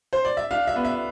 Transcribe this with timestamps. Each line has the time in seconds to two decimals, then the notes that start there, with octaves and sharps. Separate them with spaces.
0.13 C5
0.25 D5
0.37 E5
0.51 D4 F5
0.67 E5
0.76 B3
0.85 E5